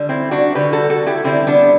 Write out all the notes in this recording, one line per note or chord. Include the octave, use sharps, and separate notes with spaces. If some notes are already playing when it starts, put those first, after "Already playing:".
Already playing: D3 G3
C4 E4
D4 F#4
D3 G3 G4 B4
F#4 A4
F#4 A4
E4 G4
D3 G3 C4 E4
B3 D4